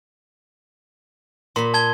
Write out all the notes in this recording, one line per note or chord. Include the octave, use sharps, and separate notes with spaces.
A#2 B5 C6
A5 G#6 G7